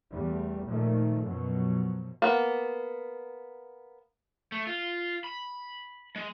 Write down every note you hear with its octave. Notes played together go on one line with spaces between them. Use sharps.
E2 G3 A3
A#2 D#3 F3 A3
F#2 B2 F3 F#3
A#3 B3
A3
F4
B5
G#3